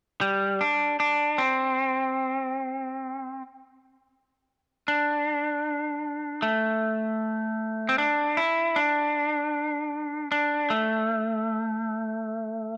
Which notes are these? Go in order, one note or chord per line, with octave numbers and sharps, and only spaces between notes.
G3
D4
D4
C4
D4
A3
C4
D4
E4
D4
D4
A3